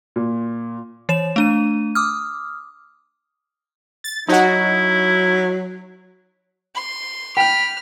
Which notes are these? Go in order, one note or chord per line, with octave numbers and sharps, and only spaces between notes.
A#2
E3 C#5 E7
A3 D4 D#7
D6 D#6 F6
A6
F#3 D#4 E4 F#4
C6
G5 B5 F6